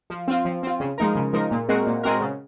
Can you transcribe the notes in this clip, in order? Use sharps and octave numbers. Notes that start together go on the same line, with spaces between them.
F3
C4 F4
F3
C4 F4
C#3
F3 G#3 D#4 A#4
C#3
F3 G#3 D#4 A#4
A#2
G#3 C4 F#4 A#4
A#2
G#3 C4 F#4 A#4
C#3